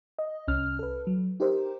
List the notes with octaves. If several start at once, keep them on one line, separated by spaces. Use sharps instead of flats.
D#5
C2 C#4 F6
A4 B4
F#3
D#4 G4 A#4 C5